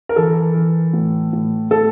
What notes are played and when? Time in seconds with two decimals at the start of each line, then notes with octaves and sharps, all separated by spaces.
0.09 A#4
0.16 E3 A4
0.55 E3
0.94 A2
1.33 A2
1.71 A2 A4